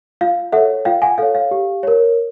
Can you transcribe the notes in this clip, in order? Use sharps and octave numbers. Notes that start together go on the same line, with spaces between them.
F4 F5
A4 C#5 E5 F#5
F4 F5 G5
F#5 G#5
A4 C#5 F5
F5
G4
A#4 C#5